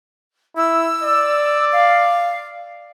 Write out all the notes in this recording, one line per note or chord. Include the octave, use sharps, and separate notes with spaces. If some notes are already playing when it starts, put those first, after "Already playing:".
E4 E6
D5
F5